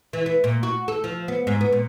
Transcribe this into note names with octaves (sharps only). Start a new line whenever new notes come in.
E3
B3
A#2
F#4
A4
F3
B3
G#2
B3
A#2